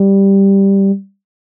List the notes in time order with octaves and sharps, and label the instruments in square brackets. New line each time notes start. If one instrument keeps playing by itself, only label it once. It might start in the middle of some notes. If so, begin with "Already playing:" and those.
Already playing: [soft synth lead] G3